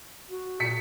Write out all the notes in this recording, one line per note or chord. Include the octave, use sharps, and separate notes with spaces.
F#4
A#2 B6 C#7